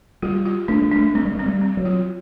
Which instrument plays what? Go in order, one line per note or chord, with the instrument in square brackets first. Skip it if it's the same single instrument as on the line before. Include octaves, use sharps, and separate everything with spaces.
[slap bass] G3 [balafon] F4
[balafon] F4
[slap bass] A3 [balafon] D4
[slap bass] G#3
[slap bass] A3 [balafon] D4
[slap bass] G#3 [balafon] C4
[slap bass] G3
G#3
[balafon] C4
[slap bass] G3
[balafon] C4
[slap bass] F#3
[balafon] F4